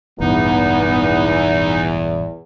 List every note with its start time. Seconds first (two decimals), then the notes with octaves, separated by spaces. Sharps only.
0.20 E1 A1 E2 G2 B3 D#4